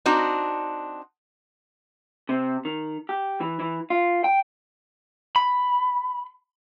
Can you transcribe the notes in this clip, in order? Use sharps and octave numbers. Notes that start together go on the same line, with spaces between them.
C4 D4 D#4 F#4
C3
D#3
G4
E3
E3
F4
G5
B5